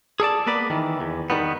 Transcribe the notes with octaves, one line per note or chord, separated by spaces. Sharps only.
G#4 A4 D5 A5
A#3 B3 B4 D5
D#3 E3
E2
D#3 G3 B3